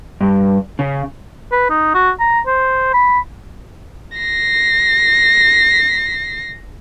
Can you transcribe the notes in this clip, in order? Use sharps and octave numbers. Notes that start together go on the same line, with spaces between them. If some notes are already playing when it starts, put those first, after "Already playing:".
G2
C#3
B4
D#4
F#4
A#5
C5
B5
A#6 C7